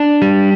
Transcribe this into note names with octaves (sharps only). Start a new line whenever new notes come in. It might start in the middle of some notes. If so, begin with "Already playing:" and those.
Already playing: D4
G3